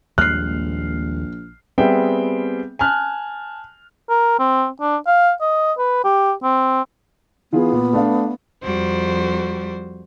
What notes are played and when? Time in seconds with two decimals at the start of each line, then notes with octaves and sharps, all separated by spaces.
0.18 A#1 D#2 G3 G#3 F6 F#6 C7
1.78 G3 B3 C4 G#4 E5 G5
2.79 G#5 A5 F6 F#6
4.09 A#4
4.39 C4
4.80 D4
5.07 F5
5.41 D#5
5.78 B4
6.04 G4
6.43 C4
7.53 E3 B3 F4 G#4
7.72 A#2
7.93 A3 D4 F5
8.63 F2 G3 F#4 C5